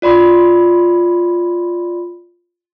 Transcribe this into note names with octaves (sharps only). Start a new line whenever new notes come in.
F4 D5 B5 C6